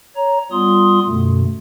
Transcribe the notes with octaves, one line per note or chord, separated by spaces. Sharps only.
C#5 A#5
G3 B3 F4 C6 D#6
F#2 B2 D3 A3